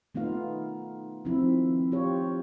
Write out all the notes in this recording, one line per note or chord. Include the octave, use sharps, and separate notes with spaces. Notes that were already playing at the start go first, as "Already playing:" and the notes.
D#3 A3 B3 D#4 F4 F5
D#3 F3 C4 E4
F4 G4 C#5